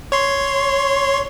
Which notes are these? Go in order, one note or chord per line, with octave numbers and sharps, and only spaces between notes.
C#5 C6